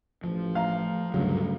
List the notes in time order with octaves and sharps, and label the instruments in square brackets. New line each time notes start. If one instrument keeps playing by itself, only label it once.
[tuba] A1 [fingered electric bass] F3
[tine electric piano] A3 [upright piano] F5 A#5
[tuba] D2 [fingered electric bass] G2 F#3 [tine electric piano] C#3 A3